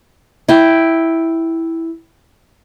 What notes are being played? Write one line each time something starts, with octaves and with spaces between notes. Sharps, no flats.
E4 G5